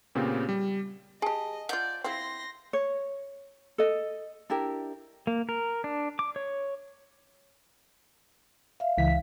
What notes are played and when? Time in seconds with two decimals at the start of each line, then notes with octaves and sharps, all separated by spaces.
0.15 A#2 C#3 B3 C4 G4
0.49 G3
1.22 G4 G#4 D#5 G#5 A5
1.69 F4 D5 F#5 G6
2.04 C4 E4 F5 F#5 C6 A#6
2.73 C#5
3.78 A4 D#5
4.50 D4 E4 G4 A#4
5.27 A#3
5.49 A#4
5.84 D4
6.19 D6
6.36 C#5
8.80 E5 F5
8.98 C#2 E3 B6